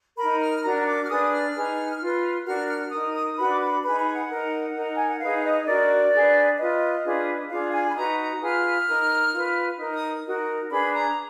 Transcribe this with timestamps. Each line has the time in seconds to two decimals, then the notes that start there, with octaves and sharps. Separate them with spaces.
0.17 D#4 A#4 B5
0.41 F6
0.63 D4 F#4 A#4 A#5
0.87 D6
1.04 F6
1.09 D4 G#4 B4 D#6
1.32 F6
1.54 D#4 G#4 B4
2.00 F4 B4
2.46 D4 F#4 A#4 F6
2.69 F6
2.91 D#4 A#4 D#6
3.14 D#6
3.37 D4 F#4 B4 B5
3.51 D6
3.61 B5
3.83 D#4 G#4 B4 B5
3.99 B5
4.13 F#5
4.29 D#4 A#4
4.74 D#4 A#4
4.95 G#5
5.08 F#5
5.20 D#4 G#4 B4 F5
5.43 D#5
5.66 D4 F#4 A#4 D5
6.12 D4 G#4 B4
6.58 F4 B4 D#5
7.03 D4 F4 G#4 B4
7.49 D4 F4 G#4 F5
7.72 G#5
7.87 B5
7.95 D#4 F#4 B4 A#5
8.18 A#5
8.41 F4 G#4 B4 F6
8.87 D#4 A#4
9.33 F4 B4
9.78 D#4 A#4
9.94 D#6
10.24 D#4 F#4 A#4
10.69 D4 G#4 B4 B5
10.92 A#5